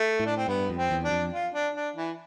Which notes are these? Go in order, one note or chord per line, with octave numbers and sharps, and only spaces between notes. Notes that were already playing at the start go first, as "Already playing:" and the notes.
Already playing: A3
A2
D4
C4
G2 B3
F2
C4
E2
D4
F2
F4
D4
D4
E3